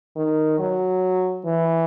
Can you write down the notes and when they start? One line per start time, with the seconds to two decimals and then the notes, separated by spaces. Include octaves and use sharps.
0.16 D#3
0.59 F#3
1.46 E3